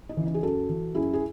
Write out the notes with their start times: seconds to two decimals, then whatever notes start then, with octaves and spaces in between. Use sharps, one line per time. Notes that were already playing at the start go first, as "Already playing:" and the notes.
0.09 D#4
0.17 C#3 E3
0.26 D#4
0.34 G#4
0.43 F#2 F#4 A4
0.69 E3
0.95 F#2 E4 G#4
1.13 G#4